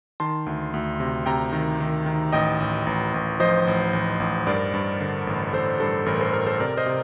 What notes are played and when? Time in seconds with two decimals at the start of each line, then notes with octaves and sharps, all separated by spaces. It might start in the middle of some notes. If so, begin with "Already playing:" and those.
0.20 D#3 A5 C6
0.46 D2
0.74 D2
1.00 C3
1.26 C3 G5 A#5
1.52 D#3
1.80 D#3
2.06 D#3
2.33 A1 D#5 G5
2.60 A1
2.87 A1
3.14 A1
3.40 F3 C5 D#5
3.67 A1
3.93 A1
4.20 A1
4.47 G2 A#4 D5
4.74 G2
5.00 D3
5.27 A1
5.53 A1 A4 C5
5.80 G2 A4
6.06 A1 A#4
6.21 A4 C5
6.33 A1 A#4
6.47 A4 C5
6.60 C3 A#4 D5
6.77 C5 D#5
6.86 C3